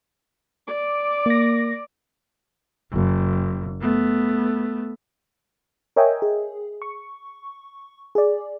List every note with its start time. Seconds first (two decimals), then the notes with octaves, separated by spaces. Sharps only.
0.67 D5 D6
1.26 A#3 A#6
2.92 F#1
3.80 A3 B3
5.96 A#4 C#5 D#5 E5 G5 G#5
6.22 G#4
6.82 C#6
8.15 G#4 D5